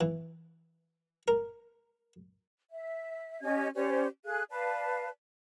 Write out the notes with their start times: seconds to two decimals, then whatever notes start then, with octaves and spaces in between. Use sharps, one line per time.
0.01 E3
1.28 A#4
2.70 E5
3.41 C#4 G4 D#5 G#6
3.74 C#4 G4 C5 D5
4.25 G#4 A4 F5 F#6
4.50 B4 D5 F5 A5